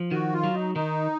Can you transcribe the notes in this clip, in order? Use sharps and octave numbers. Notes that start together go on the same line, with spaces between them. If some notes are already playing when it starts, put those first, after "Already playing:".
Already playing: F3
D#3 F#4
F4
F#3
D#4
D#3 D#4